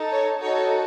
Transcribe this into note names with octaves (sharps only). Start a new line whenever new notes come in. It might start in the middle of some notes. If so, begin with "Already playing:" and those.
Already playing: D#4 A4
C#5
D#4 F#4 A4 C#5